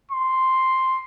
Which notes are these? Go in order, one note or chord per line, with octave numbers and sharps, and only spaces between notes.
C6